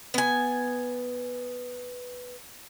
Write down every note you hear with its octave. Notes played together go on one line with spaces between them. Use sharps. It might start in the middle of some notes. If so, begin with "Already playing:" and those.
B3 G#5